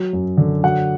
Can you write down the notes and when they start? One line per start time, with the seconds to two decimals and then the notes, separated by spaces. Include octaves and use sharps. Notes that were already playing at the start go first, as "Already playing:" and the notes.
Already playing: F#3
0.13 F#2
0.37 D3
0.63 F#3 F#5